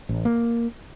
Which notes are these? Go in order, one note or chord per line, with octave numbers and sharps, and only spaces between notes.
A1
A#3